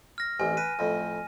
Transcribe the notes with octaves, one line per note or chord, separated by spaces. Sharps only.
F6 A#6
A1 C3 G#5
B4 D#7
F2 A2